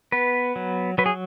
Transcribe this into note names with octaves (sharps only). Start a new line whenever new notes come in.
B3 B4
F#3
F#3 B4
G#4